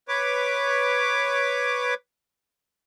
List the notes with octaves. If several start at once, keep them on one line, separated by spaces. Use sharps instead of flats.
B4 C#5 D6